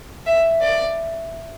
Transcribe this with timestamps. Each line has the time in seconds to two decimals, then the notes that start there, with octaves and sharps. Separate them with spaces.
0.26 E5
0.61 D5